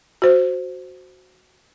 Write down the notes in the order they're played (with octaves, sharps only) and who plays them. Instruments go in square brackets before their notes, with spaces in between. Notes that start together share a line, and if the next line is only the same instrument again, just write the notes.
[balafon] F#4 C5